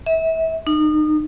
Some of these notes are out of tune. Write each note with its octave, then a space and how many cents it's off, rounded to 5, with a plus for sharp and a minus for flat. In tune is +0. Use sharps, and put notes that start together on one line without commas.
E5 -30
D#4 -30